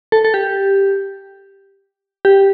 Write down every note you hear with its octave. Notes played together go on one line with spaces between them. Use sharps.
A4
A4
G4
G4